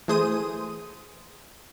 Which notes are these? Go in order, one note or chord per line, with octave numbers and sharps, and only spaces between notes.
E3 A3 G#4 C5 D#6 D#7